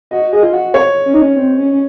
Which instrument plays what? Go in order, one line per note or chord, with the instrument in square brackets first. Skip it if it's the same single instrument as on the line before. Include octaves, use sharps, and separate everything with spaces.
[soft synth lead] F#4 [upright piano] D#5
[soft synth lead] G#4 [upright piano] D#5
[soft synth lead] F4
F#4
[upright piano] C#5
[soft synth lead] C#4
D#4
C#4
C4
C#4
C#4